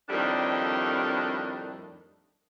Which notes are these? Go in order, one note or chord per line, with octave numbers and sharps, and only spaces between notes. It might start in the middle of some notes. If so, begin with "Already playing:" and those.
F2 A2 D#3 G3 D4